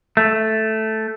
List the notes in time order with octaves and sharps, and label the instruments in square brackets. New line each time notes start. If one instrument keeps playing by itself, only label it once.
[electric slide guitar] A3